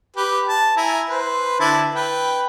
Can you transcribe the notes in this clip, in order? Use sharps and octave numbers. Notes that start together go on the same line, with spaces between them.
G4 B4
A5
E4 G#5 A#5
B4 C5
D3 E4 A5
B4 G5